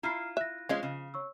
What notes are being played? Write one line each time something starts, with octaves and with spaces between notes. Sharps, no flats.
E4 F4 A#5 F6 C7
E5 F#6 A#6
F3 G#3 C#4 D#5
C#3
C#5 C#6 E6